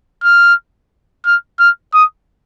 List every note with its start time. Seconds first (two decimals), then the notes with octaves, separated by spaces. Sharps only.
0.23 F6
1.25 F6
1.59 F6
1.93 D#6